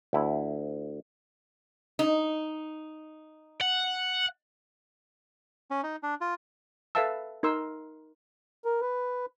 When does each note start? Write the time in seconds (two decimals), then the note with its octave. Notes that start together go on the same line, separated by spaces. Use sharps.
0.13 D2 E4
1.99 D#4
3.61 F#5
5.71 C#4
5.83 D#4
6.03 D4
6.21 F4
6.95 A4 B4 E5 F5 A5 E6
7.43 D#4 A#4 C6 E6
8.65 A#4
8.81 B4